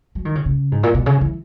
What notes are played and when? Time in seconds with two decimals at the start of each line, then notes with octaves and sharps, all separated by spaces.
0.15 F#3
0.25 D#3
0.35 C#3
0.46 C#3
0.72 G#2
0.83 A#2
0.94 B2
1.06 C#3
1.21 E3